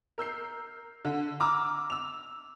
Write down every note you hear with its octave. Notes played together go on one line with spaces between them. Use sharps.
A#4 E6 G6 C7
D3
A#5 D6 E6 F6
E6 F7